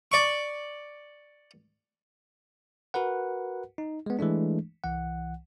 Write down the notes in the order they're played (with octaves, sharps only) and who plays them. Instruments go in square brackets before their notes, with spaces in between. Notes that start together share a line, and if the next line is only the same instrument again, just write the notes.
[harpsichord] D5 C#6
[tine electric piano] F#4 A#4 B4 F#5
D#4
G#3 B3
E3 G#3 A3 D4
C2 E3 F#5